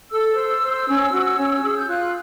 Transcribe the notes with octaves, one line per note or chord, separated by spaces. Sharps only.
A4 E6
C5
C5
C#4
F#4
C#4
G#4
G6
F4 F#6